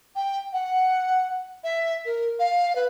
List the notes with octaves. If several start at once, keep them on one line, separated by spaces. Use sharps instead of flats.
G5
F#5
E5
A#4
F5
B4